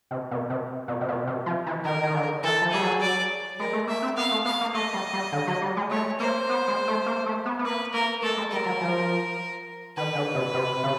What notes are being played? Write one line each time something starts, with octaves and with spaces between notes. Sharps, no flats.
C3
B2
C3
B2
C3
B2
C3
F3
E3
D#3 A#4
D#3
D3
E3 A4
F3
G3 G#4
F#3
D5
G#3 A#4
A3
A#3 E5
C4
B3 F5
A3
B3 F5
A#3
A3 D#5
G3
G3
D3
F#3
G3
G#3
A3 C#5
A#3 C5
B3
G#3
A3
A#3
A3
B3
B3
A#3 B4
A#3 A#4
A3 A4
G#3
G3 A#4
F#3
F3
D#3 B4
D3
C3
C3
C#3